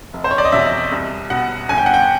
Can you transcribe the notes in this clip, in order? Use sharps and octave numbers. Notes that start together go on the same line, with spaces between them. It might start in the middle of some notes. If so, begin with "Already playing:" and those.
F1
C5
C#5
D5
D#5
E2 B2 E5
C2
B2 F#5
G1 G#5
G5
F#5
G5